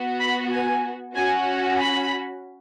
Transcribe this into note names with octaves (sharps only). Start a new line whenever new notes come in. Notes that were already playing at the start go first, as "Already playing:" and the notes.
Already playing: B3 F#4
B5
G#5
C#4 F#4 G#5
B5